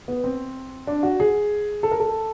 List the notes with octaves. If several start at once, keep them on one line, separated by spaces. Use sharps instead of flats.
B3
C4
D4
F#4
G#4
A4
A#4
A4